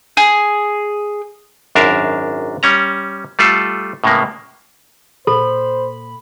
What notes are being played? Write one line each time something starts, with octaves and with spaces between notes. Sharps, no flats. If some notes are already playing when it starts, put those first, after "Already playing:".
G#4
G#1 F#2 D4 A#4 E5 F5
G3 C#4 A#5
G3 A3 F4 A4
A2 C#3 G#3 A#3 B3
A#2 A4 C5 B5